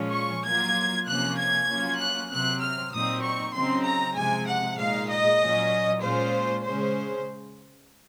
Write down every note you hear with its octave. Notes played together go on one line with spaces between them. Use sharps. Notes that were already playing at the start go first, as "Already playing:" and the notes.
Already playing: A#2 F3 G#3 C#4 F4
C#6
F#3 A#3 F4 G#6
C3 F3 A#3 C#4 F4 F#6
G#6
F#3 A#3 C#4 F4
F#6
C3 F#3 C4 F#6
F6
A#2 F#3 C4 D#4 D#6
C#6
C#3 F#3 C4 D#4 C6
A#5
C3 F3 G#3 G#5
F#5
A#2 G#3 D#4 F5
D#5
A#2 F#3 C#4
A#2 G#3 C#4 F4 C5
C#3 G#3 C#4 C5